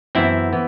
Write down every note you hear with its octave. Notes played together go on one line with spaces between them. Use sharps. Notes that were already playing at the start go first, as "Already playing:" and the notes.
F#2 E3 B3 C4 E4
E3 B3